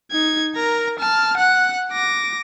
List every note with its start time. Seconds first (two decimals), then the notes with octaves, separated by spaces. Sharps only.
0.11 D#4 G#6
0.56 A#4 A#5
1.00 A5 F6
1.38 F#5 F#6
1.92 D6 A#6